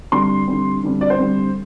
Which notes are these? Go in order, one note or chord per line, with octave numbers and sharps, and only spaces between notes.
D3 G3 C4 C6
D3 G3 C4
D3 G3 C4
D5
C5
D3 G3 C4